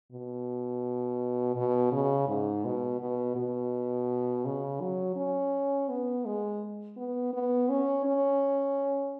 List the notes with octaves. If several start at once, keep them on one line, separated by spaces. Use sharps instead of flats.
B2
B2
C#3
G#2
B2
B2
B2
C#3
F#3
C#4
B3
G#3
B3
B3
C#4
C#4